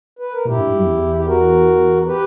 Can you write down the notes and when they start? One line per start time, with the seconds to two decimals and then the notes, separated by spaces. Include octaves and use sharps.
0.19 B4
0.32 A#4
0.45 A#2 E4 G4
0.56 G2
0.66 G2
0.76 F#2
0.86 E2
1.15 G4
1.26 F#4 A#4
2.06 G4 B4